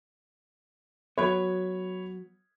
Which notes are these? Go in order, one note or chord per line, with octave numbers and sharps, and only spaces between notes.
F#3 B3 C#5 B5 G#6